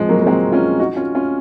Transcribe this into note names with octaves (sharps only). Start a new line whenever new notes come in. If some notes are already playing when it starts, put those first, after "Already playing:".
Already playing: F3 G#3
F#3 A#3
A#3
G#3 C4
C#4 F4
D#4 F#4
C#4 F4
C#4 F4